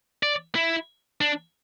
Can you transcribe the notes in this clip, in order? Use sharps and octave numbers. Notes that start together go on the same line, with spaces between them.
D5
E4
D4